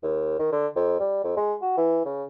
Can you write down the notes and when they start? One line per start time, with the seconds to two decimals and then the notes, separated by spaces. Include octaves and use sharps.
0.03 D#2
0.39 D#3
0.52 D3
0.76 F2
1.00 G3
1.24 F2
1.37 G#3
1.61 F#4
1.77 E3
2.05 C#3